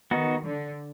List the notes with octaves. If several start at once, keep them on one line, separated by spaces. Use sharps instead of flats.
D#3 B3 D#4 F#4
D3